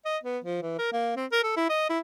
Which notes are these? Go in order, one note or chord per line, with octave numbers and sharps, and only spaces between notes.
D#5
B3
F3
E3
A#4
A#3
C4
A#4
A4
E4
D#5
E4